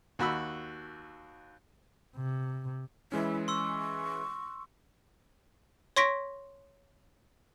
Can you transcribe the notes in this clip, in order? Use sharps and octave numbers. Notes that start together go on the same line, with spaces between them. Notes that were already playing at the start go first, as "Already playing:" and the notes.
D#2 F#4 B5 E6
C3
E3 G#3 C#4 E4
C6 C#6 E6
C#5 C6 C#6 A#6 B6 D7